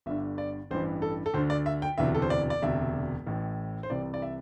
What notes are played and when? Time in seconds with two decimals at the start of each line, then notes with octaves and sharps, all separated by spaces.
0.06 G1 G2 D3 E5
0.38 D5
0.71 A1 G2 E3 C5
1.02 A4
1.26 A4
1.34 D2 C5
1.38 D3
1.50 D5
1.66 E5
1.82 G5
1.98 E1 D2 C3 E3 E5
2.15 A4
2.22 C5
2.30 D5
2.50 D5
2.62 E1 D2 C3 E5
3.27 A1 A2 E3
3.83 C5
3.90 C2 C3 E3 D5
4.14 D5
4.22 E5